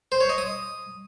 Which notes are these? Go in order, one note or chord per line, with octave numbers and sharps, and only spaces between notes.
C5
C#5
D#5
D#6